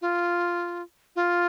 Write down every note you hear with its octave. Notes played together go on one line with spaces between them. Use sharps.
F4
F4